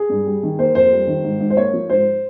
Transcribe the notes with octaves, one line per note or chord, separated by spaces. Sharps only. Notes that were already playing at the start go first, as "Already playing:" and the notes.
Already playing: G#4
G2
G3
D#3
A#3 C5
F2 C5
G3
D#3
G#2
G#2
C5
A#3 C#5
F3
G#2 C5